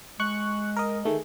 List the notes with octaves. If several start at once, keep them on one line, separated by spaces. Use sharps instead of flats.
G#3 C#6 F#6
A#4 D#5
D#3 A3 G#4